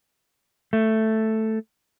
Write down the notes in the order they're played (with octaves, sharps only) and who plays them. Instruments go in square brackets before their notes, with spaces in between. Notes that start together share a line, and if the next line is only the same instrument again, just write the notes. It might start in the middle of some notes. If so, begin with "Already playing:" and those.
[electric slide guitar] A3